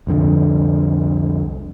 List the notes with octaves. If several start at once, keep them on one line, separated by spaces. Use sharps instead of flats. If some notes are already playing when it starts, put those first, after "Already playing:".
C2 F2 D3